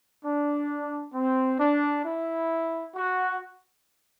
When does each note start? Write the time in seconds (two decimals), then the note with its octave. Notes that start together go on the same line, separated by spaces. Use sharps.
0.24 D4
1.13 C4
1.59 D4
2.04 E4
2.95 F#4